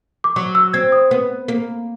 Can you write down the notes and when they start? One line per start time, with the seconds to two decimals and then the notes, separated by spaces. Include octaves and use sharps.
0.24 D6
0.36 F#3 C#6
0.55 E6
0.74 C4 G#6
0.92 D#6
1.11 B3
1.48 A#3